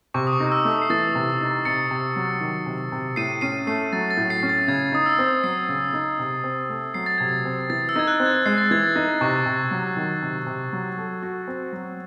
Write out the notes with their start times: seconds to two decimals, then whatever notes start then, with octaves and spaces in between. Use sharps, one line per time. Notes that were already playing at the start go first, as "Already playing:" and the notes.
0.14 C3 C#6
0.27 D#6
0.33 C#6
0.40 D#4
0.52 E6
0.64 A3
0.71 D#6
0.82 C7
0.90 E3 A6
1.15 C3
1.41 D#4
1.65 C3 A6 C#7
1.91 C3
2.16 F#3
2.41 D#3
2.66 C3
2.92 C3
3.16 A2 C7 D#7
3.41 C#4 C7 D#7
3.67 A3 C7
3.93 F#3 A6
4.11 A6
4.17 A2
4.30 C7
4.43 C#4
4.49 A6
4.68 C#3 G#6
4.92 D#4 D#6
5.06 E6
5.19 C4
5.44 F#3 C7
5.69 C#3
5.93 D#4
6.19 C3
6.44 C4
6.69 A3
6.94 F#3 C7
7.06 A6
7.18 C3 G#6
7.29 A6
7.45 C4
7.70 E3 A6
7.89 E6
7.96 D#4 G#6
8.07 F#6
8.20 C4
8.26 G#6
8.46 G#3 C7
8.58 A6
8.71 E3 G#6
8.84 A6
8.96 D#4
9.21 C3 C#6
9.46 C3
9.71 F#3
9.97 D#3
10.22 C3
10.46 C3
10.73 F#3
10.97 A4
11.23 F#4
11.48 C4
11.73 F#3